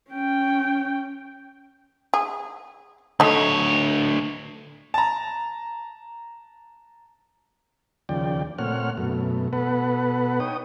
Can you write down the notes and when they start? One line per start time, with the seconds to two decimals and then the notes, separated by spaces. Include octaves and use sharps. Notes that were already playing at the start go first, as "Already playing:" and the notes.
0.11 C#4 G5
2.14 G#4
3.20 D2 A3 D#4 C#5
4.94 A5 A#5
8.09 D#2 C#3 F3 D5 G5
8.59 A#2 A3 C4 C#5 F#5 F6
8.97 F#2 B2 A3
9.53 B2 B3 A4 B4 F#5
10.40 D#4 C#5 G5 D#6